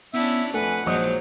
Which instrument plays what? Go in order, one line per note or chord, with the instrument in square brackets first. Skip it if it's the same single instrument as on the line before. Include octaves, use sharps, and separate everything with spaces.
[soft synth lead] B3 [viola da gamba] C#4 D4 E4 [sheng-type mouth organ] E5
[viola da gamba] F2 B4 [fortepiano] A3 [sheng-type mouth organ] F#5 [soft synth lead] G#5
[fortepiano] A#1 D#5 D#6 [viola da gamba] F#3 G#3 D#4 [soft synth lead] C5